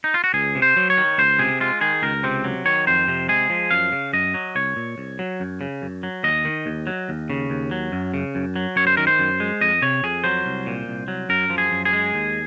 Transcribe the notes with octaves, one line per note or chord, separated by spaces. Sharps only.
D#4
F4
F#4
C#2 G#4
C3
C5
F#3
C#5
D#3
C#2 C5
C3 G#4
G#3 F4
D#3 G#4
C#2 A#4
C3 C4
F#3
D#3 C#5
F2 C5
C3
G#3 G#4
F3
F#2 F5
C#3
F#2 D#5
F#3
C2 C#5
A#2
C2
F#3
F#2
C#3
F#2
F#3
D#2 D#5
D#3
D#2
F#3
D#2
C#3
D#2
F#3
F#2
C#3
F#2
F#3
F#2 C#5
C5
D#3 A#4
C5
F#2
G#3
F2 D#5
C3 C#5
F2 G#4
F#3 C5
C2
A#2
C2
F#3
F#2 A#4
F3
G#4
F#2
G#4
G#3
D#2